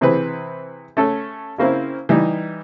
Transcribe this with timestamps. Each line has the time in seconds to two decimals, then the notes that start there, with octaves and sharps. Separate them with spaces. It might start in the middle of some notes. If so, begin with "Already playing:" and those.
0.01 C3 E3 C4 G#4 B4
0.97 A3 C#4 A4
1.58 C#3 A#3 C4 E4
2.09 E3 G3 D#4